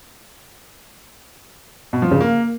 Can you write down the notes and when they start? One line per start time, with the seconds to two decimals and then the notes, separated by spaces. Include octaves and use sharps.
1.93 B2
2.02 F3
2.11 C#3
2.21 A#3